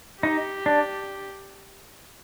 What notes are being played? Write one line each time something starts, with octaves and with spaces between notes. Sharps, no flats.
D#4 G4
D4